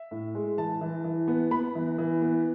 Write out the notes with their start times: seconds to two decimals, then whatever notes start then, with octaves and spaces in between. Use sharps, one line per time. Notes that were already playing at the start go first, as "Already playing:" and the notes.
Already playing: E5
0.11 A2
0.35 G#3
0.57 E3 A5
0.81 E3
1.04 E3
1.28 B3
1.51 B3 B5
1.75 E3
1.98 E3
2.22 B3